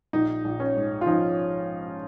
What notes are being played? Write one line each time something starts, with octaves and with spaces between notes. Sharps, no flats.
A#1 D#4
A#1
C#4
G#2
F4
F3 D#4